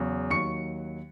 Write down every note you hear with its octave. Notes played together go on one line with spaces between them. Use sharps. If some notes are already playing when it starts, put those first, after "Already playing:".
Already playing: E2 C#3 F#3
D#2 D#3 F#3 C#6 C#7